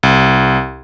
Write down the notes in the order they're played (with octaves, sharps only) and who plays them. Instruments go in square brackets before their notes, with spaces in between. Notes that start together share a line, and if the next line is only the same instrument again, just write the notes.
[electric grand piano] C2